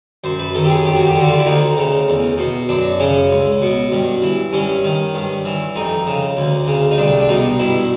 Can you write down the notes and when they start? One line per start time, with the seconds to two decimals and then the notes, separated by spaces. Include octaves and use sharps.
0.24 F#2 C5
0.39 B4
0.55 D#3 A4
0.65 G4
0.70 G#4
0.85 F2 G4
0.96 F#4
1.07 G4
1.16 D3 F#4
1.29 F4
1.39 E4
1.46 D2 D#4
1.77 C#3
2.09 E2
2.38 B2
2.69 F#2 D4
3.00 C#3 C#4
3.31 C#2
3.62 B2
3.91 G2
4.22 E3
4.53 G2 C#4
4.84 D#3
5.14 G2
5.45 E3
5.76 F2 D#4
6.07 C#3
6.37 D2
6.67 C#3
6.91 D#4
6.98 C2 D4
7.20 D4
7.29 B2 D#4
7.60 G2 E4